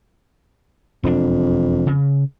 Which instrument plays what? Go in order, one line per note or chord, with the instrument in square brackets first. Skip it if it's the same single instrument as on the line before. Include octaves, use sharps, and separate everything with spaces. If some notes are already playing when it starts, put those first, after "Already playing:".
[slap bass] E1 D4 [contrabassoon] F2
[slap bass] C#3